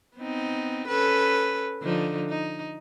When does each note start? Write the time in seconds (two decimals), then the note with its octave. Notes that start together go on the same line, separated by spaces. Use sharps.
0.17 B3 C4 D#4
0.88 C#4 A4 B4
1.82 D3 F3 D#4
2.29 D#4